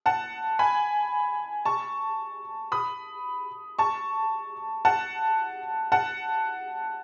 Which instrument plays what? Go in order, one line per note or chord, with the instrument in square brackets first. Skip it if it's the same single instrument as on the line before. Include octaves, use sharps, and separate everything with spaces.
[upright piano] F#5 A5
G#5 B5
A5 C#6
B5 D#6
A5 C#6
F#5 A5
F#5 A5